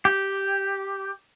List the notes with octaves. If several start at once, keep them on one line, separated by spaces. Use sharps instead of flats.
G4